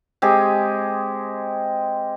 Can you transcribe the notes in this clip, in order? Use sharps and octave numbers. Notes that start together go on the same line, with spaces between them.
G#3 C4 G4 G#4